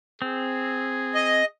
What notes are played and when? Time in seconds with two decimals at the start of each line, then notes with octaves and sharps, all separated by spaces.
0.22 C4 G#4
1.14 D#5